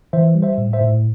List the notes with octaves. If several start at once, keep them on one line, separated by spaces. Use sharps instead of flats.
E3 C5 E5
G3
C5 E5
A2
C5 E5
A2